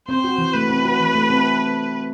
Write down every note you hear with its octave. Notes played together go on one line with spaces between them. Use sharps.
C4 C5
F#4
E3
A3 B4
C4
F#4
E3
A3
C4